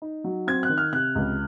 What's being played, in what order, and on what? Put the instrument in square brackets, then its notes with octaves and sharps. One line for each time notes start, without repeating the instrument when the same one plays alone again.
[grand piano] D#4
F#3
C4 G#6
F#6
D#3
F6
C3 F#6
C#2